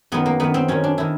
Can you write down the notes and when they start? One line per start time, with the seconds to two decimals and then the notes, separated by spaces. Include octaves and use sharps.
0.12 F#2 D#3 B3
0.26 A#3
0.40 F#2 D#3 B3
0.54 C4
0.68 F#2 D#3 C#4
0.84 D4
0.98 D#3 E4